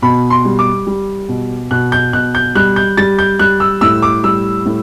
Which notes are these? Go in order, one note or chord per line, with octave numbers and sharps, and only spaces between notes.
B2 B5
C6
G3
D6
G3
B2
B2 F#6
G6
B2 F#6
G6
G3 F#6
G6
G3 A6
G6
G3 F#6
E6
A2 E6
D6
G3 E6
A2